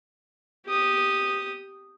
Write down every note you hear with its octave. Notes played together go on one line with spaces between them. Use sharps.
G4 D#6